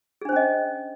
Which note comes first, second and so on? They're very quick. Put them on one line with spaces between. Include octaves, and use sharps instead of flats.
G#4 D4 C5 C#4 D#5